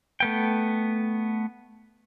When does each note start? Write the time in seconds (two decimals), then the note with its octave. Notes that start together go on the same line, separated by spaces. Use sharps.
0.20 A3 B3 G5